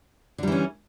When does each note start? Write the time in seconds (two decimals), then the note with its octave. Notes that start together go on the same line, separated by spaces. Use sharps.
0.38 D3
0.43 G3
0.47 E3
0.52 C#4